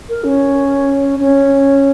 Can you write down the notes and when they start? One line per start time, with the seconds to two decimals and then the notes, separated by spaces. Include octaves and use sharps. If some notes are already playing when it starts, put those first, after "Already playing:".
0.09 A#4
0.24 C#4
1.20 C#4